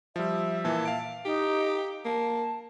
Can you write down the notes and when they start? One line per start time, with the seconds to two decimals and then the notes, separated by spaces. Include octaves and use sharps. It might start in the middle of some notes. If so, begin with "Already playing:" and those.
0.16 F3 G3 E5
0.64 A#2 E3 A#3 A5
0.85 F5 D7
1.25 D#4 G4
2.05 A#3 A5